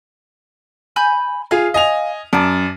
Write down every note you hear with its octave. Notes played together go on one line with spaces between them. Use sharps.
G#5 B5 G6
F4 G#4 F5
D#5 G#5 F7
F#2 D5 A5